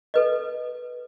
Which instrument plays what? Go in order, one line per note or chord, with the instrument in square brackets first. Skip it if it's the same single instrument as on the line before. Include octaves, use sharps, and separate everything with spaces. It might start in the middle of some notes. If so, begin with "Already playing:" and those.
[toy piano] A4 B4 D#5